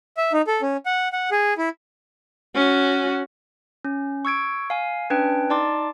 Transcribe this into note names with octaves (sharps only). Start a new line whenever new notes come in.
E5
D#4
A4
C#4
F#5
F#5
G#4
E4
C#4 F#4
C#4
C#6 E6 G#6 D7
F5 G#5
C#4 D4 B4 G5
D#4 D5 A5 C6 D6